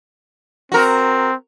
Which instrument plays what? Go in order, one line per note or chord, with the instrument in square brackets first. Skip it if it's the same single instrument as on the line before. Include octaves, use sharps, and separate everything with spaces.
[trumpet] C4 [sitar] F#4 A#4